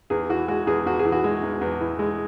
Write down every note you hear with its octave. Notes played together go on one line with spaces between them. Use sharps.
E2 G#4
E3 F#4
G#3 F#4
E2 G#4
E2 F#4
G#4
E3
F#4
G#3
E2
E2
E3
G#3